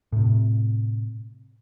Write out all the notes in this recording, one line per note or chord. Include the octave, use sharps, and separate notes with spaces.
A2 C3